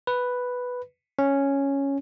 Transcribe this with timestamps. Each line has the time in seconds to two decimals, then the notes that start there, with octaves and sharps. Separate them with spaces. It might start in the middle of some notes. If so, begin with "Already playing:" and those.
0.07 B4
1.19 C#4